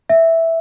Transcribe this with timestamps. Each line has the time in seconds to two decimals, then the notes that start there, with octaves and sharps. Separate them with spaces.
0.09 E5